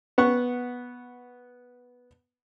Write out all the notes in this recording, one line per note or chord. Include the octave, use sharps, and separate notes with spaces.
B3 F#5 C#6